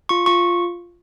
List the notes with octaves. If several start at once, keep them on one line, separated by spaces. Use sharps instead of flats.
F4 C#6
F4 C#6